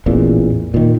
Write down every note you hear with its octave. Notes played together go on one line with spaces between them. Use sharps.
A1 E2 A#2
A#2 D#3